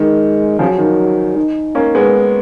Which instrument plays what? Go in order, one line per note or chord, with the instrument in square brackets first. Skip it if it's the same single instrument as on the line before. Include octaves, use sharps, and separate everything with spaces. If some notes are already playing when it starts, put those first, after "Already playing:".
Already playing: [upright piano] D#3 [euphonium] G#3
[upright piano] C#3 F3 [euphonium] F#3
[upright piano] D#3
[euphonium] D#4
[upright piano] A#3 C#4
G#3 B3